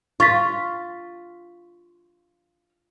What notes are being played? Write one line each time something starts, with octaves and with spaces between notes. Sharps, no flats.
F4 C#6 A6 B6